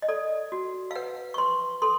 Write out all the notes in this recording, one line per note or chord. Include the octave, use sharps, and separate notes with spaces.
D#5
A4 D5
F#4
F5
B4 F#5
C#6
B4 C6
A4 C6